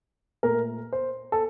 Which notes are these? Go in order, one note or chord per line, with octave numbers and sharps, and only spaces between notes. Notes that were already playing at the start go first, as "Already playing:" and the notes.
A#2 A3 A#4
C5
A4